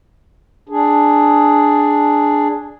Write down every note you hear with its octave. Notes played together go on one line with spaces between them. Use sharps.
D4 G#4